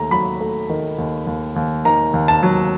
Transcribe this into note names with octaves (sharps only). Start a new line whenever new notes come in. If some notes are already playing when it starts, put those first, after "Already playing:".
Already playing: D#2 A3 A#5
F#3 B5
A3
D#3
D#2
D#2
D#2
D#3 A#5
D#2
A5
F#3